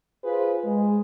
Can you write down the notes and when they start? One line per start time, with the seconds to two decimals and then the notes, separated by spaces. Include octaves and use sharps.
0.24 F4 G#4 B4 C5
0.65 G#3